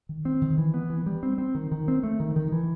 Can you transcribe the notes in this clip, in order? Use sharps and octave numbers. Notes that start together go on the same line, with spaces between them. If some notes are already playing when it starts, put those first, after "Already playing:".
D#3
C4
D#3
E3
B3
E3
G3
C4
C4
D#3
D#3
C4
A3
D#3
D#3
E3